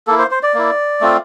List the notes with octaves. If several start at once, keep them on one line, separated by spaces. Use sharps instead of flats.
A#3 E4 A4
C5
C5
D5
A#3 E4
A3 C4 F4